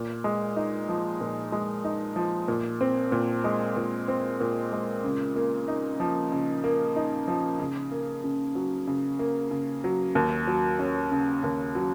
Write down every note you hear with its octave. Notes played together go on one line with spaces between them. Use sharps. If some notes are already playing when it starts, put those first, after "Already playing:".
Already playing: A#2
G#3
D#4
F3
A#2
G#3
D#4
F3
A#2
C4
A#2
G#3
A#2
C4
A#2
G#3
C#3
A#3
D#4
F3
C#3
A#3
D#4
F3
C#3
A#3
C#3
F#3
C#3
A#3
C#3
F#3
D#2
F#3
C#4
C#3
D#2
F#3